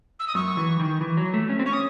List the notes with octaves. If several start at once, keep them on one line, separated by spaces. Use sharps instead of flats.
E6
D#6
F#2 C#6
E3
D#3
E3
F#3
A3
C#4
C4
C#4 C#6
D#6